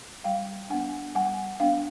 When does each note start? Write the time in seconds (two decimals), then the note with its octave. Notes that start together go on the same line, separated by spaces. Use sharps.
0.24 G3 F5 G5
0.70 B3 D4 F#5 G#5
1.15 G3 F#5 G#5
1.60 B3 D4 F5 G5